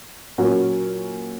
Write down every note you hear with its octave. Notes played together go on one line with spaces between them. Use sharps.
A#2 F#3 C#4 F#4 A#4